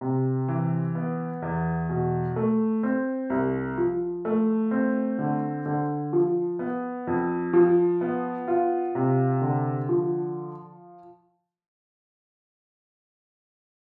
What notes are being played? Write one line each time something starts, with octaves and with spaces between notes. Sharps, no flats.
C3
E3
B3
E2
B2
A3
C4
C2
F3
A3
C4
D3
D3
F3
B3
F2
F3
B3
F4
C3
D3
F3